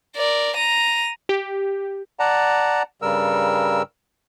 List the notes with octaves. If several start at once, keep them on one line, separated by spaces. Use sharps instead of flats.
A#4 D5
A#5 D#7
G4
D5 F#5 A5 A#5
G2 C#3 G3 A#4 E6